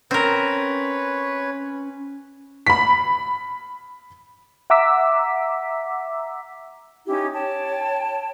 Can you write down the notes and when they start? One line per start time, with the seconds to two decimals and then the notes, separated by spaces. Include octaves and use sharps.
0.11 C4 C#4 A#4 B4 C#5
2.67 B5 B6
4.70 E5 F#5 A#5 D6 E6 B6
7.06 C#4 D#4 E4 G4
7.34 C#5 G5 A5